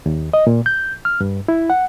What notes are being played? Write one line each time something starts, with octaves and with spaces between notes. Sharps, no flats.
D#2
D#5
A#2
G6
F6
G2
E4
F#5